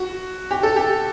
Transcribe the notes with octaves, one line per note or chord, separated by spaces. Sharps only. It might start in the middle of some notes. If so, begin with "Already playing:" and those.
Already playing: F#4
G4
A4
G4